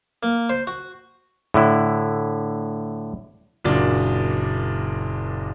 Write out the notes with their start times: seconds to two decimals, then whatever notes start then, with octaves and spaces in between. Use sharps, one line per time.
0.23 A#3
0.50 C5
0.67 F#4
1.54 A2 D3 E4
3.64 F#1 A#2 F#3 D4 A6